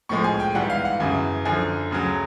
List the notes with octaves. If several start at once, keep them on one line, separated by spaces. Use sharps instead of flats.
A2 F3 G#3 C#6
G#5
G5
G#2 E3 G3 F#5
F5
F#5
F#2 C#3 E3
F#2 D3 F3 G#5
D2 C#3 F#3